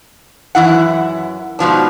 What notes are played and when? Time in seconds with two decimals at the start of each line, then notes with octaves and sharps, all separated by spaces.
0.55 F#2 E3 E4 F#5
1.59 G#2 B2 F3 D4